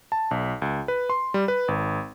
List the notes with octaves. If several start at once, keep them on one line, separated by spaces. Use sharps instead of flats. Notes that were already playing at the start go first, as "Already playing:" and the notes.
A5
B1
C#2
B4
C6
G3
B4
G#1